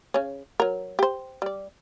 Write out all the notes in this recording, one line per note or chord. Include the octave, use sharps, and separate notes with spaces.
C#3 C#4
F#3 A#4
G4 C5
G3 D5